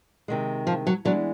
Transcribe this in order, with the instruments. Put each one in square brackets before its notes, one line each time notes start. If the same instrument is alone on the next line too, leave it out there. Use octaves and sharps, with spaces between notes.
[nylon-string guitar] C3 D#3 G#3
[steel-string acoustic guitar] F3
F#3
[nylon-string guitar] E3 G#3 B3 D4 [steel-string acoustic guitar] F#3